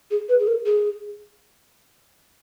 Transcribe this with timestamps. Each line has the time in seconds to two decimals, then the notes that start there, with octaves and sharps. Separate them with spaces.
0.11 G#4
0.29 B4
0.40 G#4
0.47 A#4
0.66 G#4